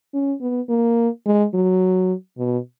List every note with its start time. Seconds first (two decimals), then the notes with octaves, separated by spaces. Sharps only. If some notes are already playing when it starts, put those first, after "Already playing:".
0.14 C#4
0.41 B3
0.69 A#3
1.26 G#3
1.54 F#3
2.38 B2